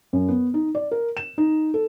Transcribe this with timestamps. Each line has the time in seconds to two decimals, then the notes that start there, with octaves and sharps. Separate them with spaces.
0.13 F#2
0.28 B3
0.54 D#4
0.75 D5
0.91 A#4
1.17 E7
1.38 D#4
1.74 A4